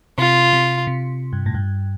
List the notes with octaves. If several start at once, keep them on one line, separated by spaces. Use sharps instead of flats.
C3 F4
C3
C3
G2
A2
G2